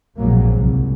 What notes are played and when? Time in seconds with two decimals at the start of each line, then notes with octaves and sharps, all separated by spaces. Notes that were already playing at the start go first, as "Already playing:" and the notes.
0.18 A#1 F2 G#2 B2 F#3 A#3
0.55 C2